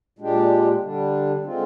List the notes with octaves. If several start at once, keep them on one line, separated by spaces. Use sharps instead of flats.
A#2 G#3 D4 G4
D3 G3 D4
D3 G#3 C4 F4